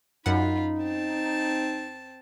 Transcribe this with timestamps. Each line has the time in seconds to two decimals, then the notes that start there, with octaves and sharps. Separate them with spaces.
0.26 F#2 D#4 F4 F#5 B5
0.80 C4 A5